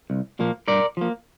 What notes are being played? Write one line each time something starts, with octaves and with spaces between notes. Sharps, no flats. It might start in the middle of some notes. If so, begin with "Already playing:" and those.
C2
A#2 F3 A#3
G2 A#4 D5
F3 A#3